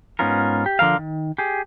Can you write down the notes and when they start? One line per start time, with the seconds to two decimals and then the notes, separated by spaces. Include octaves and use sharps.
0.19 G#2 B3 C#4 F4 A#4
0.66 G4
0.79 D3 F3 A#4 F5
0.99 D#3
1.38 G4 G#4